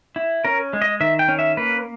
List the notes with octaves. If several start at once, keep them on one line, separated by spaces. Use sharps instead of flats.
E4
C#4 A#4
G#3
D#5
D#3 E5
G5
C#4
E5
A#3 B4